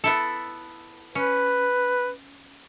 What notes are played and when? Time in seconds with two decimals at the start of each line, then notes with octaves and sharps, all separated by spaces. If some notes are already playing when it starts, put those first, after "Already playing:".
0.04 B3 E4 A4
1.15 C#4 B4